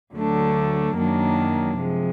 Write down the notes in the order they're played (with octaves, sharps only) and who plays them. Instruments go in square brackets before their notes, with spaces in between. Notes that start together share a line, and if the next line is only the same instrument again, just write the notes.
[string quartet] D2 D3 F#3 A3 D4
F#2 D#3 F#3 A#3 D4
C3 F3 G#3